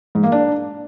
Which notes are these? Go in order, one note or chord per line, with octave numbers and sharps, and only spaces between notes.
G#2
A#3
D4